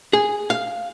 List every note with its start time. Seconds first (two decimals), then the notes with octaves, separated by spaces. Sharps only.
0.13 G#4
0.50 F5